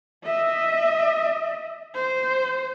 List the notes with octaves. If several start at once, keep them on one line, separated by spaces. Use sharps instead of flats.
D#5 E5
C5